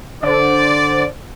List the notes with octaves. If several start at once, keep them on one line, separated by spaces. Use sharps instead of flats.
D3 C5 D5